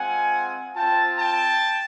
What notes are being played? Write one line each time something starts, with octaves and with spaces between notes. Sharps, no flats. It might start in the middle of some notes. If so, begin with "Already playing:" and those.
Already playing: G#3 C4 F4 F#5 G#5
C4 F4 G5 A5
G5 A5